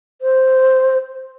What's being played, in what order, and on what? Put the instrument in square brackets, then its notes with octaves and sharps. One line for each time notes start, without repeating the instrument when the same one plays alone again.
[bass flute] C5